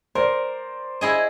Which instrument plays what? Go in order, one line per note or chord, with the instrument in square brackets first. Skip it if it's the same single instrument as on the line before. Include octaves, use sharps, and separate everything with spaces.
[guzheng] A#4 [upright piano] C5 D5
[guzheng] E4 G#4 D#5